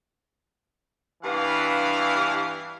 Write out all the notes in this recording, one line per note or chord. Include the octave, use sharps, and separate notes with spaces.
G2 E3 B3 D4 F5